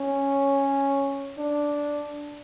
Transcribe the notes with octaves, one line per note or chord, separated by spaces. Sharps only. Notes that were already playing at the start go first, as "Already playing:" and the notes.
Already playing: C#4
D4